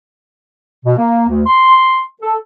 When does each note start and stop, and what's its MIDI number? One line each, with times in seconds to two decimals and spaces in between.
0.85 0.96 47
0.98 1.28 58
1.29 1.42 38
1.46 2.02 84
2.22 2.35 69